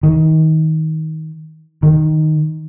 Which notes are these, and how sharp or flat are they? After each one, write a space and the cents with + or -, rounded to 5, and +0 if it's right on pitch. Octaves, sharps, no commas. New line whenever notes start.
D#3 +25
D#3 +0